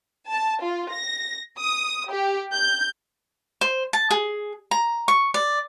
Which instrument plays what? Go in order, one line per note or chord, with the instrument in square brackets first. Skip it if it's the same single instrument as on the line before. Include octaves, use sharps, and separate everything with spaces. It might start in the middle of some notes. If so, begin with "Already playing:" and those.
[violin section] A5
F4
A#6
D#6
G4
G6
[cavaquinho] C5
A5
G#4
A#5
C#6
D5